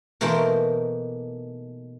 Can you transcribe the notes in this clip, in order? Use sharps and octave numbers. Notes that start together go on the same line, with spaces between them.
B2 E3 A3 A#3 D#4 C5